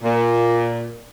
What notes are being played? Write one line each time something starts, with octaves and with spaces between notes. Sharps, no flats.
A#2